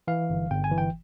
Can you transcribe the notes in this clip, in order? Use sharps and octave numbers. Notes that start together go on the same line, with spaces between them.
E3 F5
G1
G1 G5
G#5
E3
G5